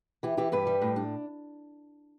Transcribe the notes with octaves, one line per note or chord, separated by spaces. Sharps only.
E3 E4 G4
E3 E4 G4
G2 G4 B4
G3
A2
D4